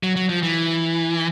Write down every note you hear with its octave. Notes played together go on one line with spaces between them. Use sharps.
F#3
F#3
F3
E3